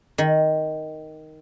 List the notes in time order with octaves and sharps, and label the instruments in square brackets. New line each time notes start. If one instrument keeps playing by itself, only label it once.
[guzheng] D#3